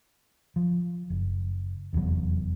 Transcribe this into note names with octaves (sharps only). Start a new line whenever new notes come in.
F3
F#1
F1 E2 A#2 F#3